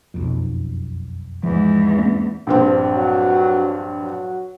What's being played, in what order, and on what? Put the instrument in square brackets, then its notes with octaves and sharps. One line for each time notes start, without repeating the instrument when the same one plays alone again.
[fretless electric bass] F#1 B1 F2
[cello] E2 G#2 [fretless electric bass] F3
[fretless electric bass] A#3 C4 C#4
[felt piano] A#1 G2 C4
[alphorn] F#3
F#3